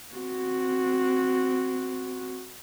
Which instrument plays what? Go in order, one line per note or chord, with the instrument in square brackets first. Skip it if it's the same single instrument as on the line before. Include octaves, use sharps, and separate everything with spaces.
[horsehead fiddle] C4 F#4